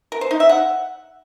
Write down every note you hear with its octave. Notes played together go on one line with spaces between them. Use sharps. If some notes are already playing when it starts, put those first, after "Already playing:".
A#4
C5
D#4
E5
F#5